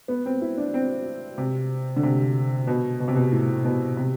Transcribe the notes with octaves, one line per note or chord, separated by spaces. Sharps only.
B3
C4
E4
D4
C4
C3
D3
C3
B2
B2
C3
B2
A2
B2
C3